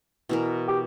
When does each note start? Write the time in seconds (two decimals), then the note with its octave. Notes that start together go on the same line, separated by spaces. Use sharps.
0.29 B2 E3 A#4
0.68 G4